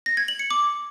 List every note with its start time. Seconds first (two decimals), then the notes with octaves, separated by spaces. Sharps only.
0.06 A#6
0.17 G#6
0.28 F#7
0.39 C#7
0.51 D6